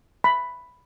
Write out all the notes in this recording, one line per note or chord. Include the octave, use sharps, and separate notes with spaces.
B5